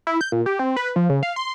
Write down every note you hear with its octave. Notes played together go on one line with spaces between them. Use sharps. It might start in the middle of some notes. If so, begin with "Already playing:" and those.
E4
G6
A#2
G4
C4
B4
F3
C#3
F5
C6